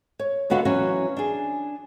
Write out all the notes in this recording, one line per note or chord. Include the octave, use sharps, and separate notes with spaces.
C#5
D#2 D3 B3 F#4 F5 F#5
E3 F#3 C#4 F#4
D4 G#4